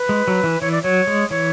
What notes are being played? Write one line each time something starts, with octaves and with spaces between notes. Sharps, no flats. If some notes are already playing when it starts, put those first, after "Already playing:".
Already playing: B4
G#3
F#3
E3
E3 C#5
D5
F#3 C#5
G#3
E3 C#5